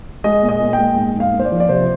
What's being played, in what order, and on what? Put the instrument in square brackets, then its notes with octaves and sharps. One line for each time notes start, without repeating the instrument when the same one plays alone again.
[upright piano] G#3 D#5
A#2
D#5
A#2
G5
G#3
G#2
G#2 F5
A#3
C5
D5
F3
D5
C3 C5